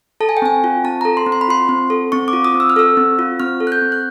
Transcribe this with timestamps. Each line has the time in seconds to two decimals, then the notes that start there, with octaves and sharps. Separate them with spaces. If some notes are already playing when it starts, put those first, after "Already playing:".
0.20 A4 A5
0.29 G#5
0.37 G5
0.42 C4 G#5
0.64 F4
0.84 C4 A5
1.01 A4 A#5
1.17 C6
1.26 C4
1.32 C6
1.41 B5
1.48 F4 C6
1.69 C4
1.90 A4
2.12 C4 C#6
2.28 D6
2.33 F4
2.44 D#6
2.54 C4
2.60 E6
2.70 F6
2.76 A4 E6
2.97 C4
3.19 F4
3.40 C4 F6
3.60 A4
3.67 F#6
3.72 G6
3.82 C4
3.92 F#6